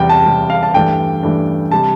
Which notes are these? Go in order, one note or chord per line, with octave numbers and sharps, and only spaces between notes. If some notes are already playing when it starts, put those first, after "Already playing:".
Already playing: E2 C3 G3 G5
A5
E2 C3 G3
F5
A5
G2 E3 A3 D4 G5
G2 E3 A3 D4
C3 G3 A5